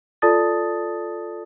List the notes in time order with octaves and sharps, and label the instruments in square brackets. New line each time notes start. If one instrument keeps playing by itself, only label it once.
[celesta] F4 A4 D5 A5 D#6 A6